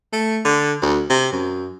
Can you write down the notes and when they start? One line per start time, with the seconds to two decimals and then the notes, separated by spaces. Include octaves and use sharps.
0.12 A3
0.45 D3
0.82 D2
1.10 C3
1.32 F#2